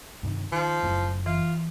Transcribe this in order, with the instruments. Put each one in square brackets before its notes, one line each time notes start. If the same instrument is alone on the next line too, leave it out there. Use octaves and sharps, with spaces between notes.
[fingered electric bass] G2 C3 D#3
[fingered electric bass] D#3 [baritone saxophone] F3
[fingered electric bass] F#1 F#2 A2
[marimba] E3 [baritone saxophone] F4